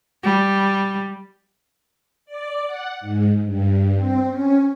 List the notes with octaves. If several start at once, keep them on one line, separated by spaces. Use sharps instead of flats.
G3
D5
F#5
G#2
G2
C4
C#4